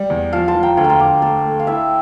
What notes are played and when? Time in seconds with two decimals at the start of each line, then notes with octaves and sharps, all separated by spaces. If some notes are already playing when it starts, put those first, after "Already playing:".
Already playing: G3
0.10 E2
0.33 F3 F5 A5
0.48 A5 C6
0.55 F3
0.63 G5 A#5
0.77 D2 F5 A5
0.84 A#5
0.89 A5 C6
1.00 D2 A#5 D6
1.22 A3 A5 C6
1.45 A3
1.59 F5
1.67 E4 E5 G5